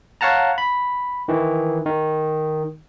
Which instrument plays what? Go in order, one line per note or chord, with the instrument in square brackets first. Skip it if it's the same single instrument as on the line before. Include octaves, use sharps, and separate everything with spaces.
[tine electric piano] C#5 F5 F#5 A5 A#5
B5
D#3 E3
D#3